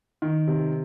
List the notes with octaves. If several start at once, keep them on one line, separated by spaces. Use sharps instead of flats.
D#3
C3